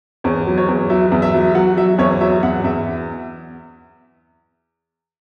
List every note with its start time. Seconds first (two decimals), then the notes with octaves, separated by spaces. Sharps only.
0.24 E2 C#5
0.47 F#3
0.58 C#5
0.68 E2
0.90 F#3 E5
1.12 E2
1.22 E5
1.34 F#3
1.55 F#3 F#5
1.77 F#3 E5
1.98 E2 C#5
2.21 F#3 E5
2.43 E2 F#5
2.64 E2 E5